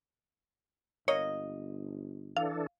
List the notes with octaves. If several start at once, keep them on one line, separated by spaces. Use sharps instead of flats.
G1 A#3 C#5 D#5
E3 D4 A4 F5